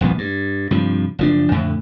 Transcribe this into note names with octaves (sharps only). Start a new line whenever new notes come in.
D#1 C2 F3 B3
G2
G2 C3 F3
F#1 F3 D4
F2 A2 D3